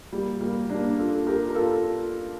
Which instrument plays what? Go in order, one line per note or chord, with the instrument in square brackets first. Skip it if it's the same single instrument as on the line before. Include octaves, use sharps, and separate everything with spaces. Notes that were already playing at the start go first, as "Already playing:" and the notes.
[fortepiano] G3 A#3
G3 A#3
A#3 D4
F4 A4
G4 A#4
A#4
F4 A4